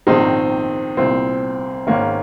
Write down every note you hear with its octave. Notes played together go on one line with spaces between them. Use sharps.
A#1 G#2 D#3 C4 D#4
C2 A#2 C4
G#1 G#2 D#3 A#3 C#4